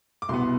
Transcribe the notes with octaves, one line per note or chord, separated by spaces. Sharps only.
D6
C2 B2 B3 C6